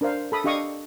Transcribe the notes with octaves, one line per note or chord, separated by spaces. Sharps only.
D4 A#4 C5 F5
A4 B5 D#6
D4 G4 D#5 F5 C#6 D#6